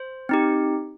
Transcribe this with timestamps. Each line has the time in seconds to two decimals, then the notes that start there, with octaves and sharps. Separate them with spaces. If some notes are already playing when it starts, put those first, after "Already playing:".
Already playing: C5
0.29 C4 D#4 G4